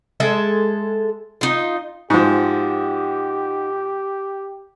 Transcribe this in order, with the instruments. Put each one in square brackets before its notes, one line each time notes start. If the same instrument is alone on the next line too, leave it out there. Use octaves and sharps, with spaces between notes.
[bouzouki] G#3 A4 E5
D#4 F4
[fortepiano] G#2 F3 [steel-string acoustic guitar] D#4 F#4 [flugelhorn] G4